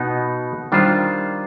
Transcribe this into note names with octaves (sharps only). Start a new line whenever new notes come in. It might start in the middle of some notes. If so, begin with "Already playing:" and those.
Already playing: B2 B3 D#4 B4
D#3 G3 D4 F4 C5